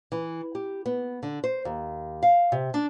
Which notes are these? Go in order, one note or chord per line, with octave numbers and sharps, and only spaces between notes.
E3
G4
B3
D3
C5
D#2
F5
C3
D4